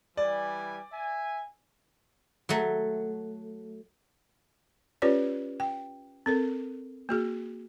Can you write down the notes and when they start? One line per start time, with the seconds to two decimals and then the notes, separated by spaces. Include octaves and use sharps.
0.17 E3 G3 D5 G#5
0.93 E5 G#5
2.49 F#3 A3
5.02 C#4 F4 G4 B4 C#5 D5
5.60 G5
6.26 C4 A4 A#4
7.09 A#3 F#4 G#4